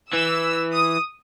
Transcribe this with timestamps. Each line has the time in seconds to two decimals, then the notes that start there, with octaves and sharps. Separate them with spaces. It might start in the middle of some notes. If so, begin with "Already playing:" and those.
0.13 E3 E6
0.73 D#6